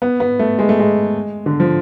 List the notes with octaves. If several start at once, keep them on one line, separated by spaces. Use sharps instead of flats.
B3
B3
A3
G#3
A3
G#3
D3
F3